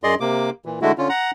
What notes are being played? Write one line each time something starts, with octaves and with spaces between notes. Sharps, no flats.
F#2 G#4 D5 D#5 C6
C3 A#3 D6
A#2 E3
D3 G#3 A3 E4 F#4
D3 C#4 F4
F#5 A#5